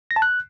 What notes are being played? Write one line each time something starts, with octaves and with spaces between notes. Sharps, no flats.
A#6
A5
F#6